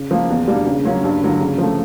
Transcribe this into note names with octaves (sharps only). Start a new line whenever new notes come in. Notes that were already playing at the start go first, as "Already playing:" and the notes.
Already playing: C#3
F3 A#3
E2
B2 G3 A#3 D4
C#3
F#3 A#3 C#4 F4
G2
D3 F#3 A#3
C#3
F3 A3